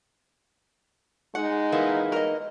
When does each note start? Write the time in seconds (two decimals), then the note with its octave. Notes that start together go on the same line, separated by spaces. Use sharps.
1.35 G#3 D#4 F#5
1.72 E3 A#3 B3
2.12 A#4 D#5